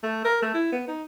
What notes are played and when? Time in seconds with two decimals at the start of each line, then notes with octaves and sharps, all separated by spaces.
0.03 A3
0.25 A#4
0.42 A3
0.54 E4
0.72 B3
0.88 D#4